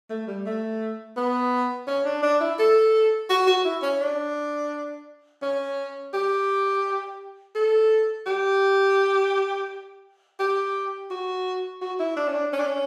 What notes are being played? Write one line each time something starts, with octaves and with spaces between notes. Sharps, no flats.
A3
G3
A3
B3
C#4
D4
D4
E4
A4
F#4
F#4
E4
C#4
D4
C#4
G4
A4
G4
G4
F#4
F#4
E4
D4
C#4
D4
C#4
D4
C#4